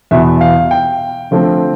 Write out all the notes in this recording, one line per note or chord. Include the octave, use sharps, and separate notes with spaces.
E2 B2 B3 E4 E5
F5
G5
D3 F3 A3 C4